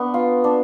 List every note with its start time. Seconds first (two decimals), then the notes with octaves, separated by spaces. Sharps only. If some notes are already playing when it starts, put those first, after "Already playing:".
Already playing: B3 D4 C#6
0.14 F4
0.44 D4